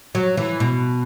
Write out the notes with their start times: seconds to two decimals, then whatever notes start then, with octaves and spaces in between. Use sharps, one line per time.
0.15 F#3
0.37 E3
0.60 B2